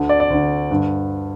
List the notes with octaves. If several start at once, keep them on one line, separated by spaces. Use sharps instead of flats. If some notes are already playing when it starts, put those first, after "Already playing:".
Already playing: D2 D3
D5
D5
D2 D3
G2 D3